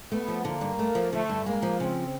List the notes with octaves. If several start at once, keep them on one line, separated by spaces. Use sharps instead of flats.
A3 B3
F3
D3 A#3
G2
A3
F3
D3 A3
G2
G#3 A#3
F3
C#3 C4